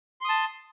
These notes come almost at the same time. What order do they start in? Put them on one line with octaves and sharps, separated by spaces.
C6 D#6 A5